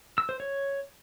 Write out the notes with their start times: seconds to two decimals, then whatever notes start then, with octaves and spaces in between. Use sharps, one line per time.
0.18 E6
0.29 C5
0.40 C#5